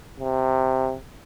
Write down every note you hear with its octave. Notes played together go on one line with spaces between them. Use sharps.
C3